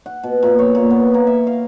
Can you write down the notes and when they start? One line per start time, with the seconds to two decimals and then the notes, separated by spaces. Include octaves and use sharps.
0.06 F#5
0.23 B2
0.43 A#2
0.59 C#5
0.75 A#2
0.91 B3
1.14 A#3
1.27 E5
1.47 F5